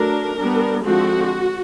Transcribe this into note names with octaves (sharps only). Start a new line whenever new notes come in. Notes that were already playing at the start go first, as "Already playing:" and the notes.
Already playing: F#3 A3 D4 A#4
G3 B3 D4
D3 F3 G#3 C4 F#4